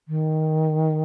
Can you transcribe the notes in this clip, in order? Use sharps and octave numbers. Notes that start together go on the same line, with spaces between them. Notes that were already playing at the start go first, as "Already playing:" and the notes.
D#3